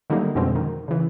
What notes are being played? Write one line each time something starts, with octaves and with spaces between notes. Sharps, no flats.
D3 D#3 F#3 G3 A3 A#3
F2 B2 D3 G#3 C4
D#3
C#3 E3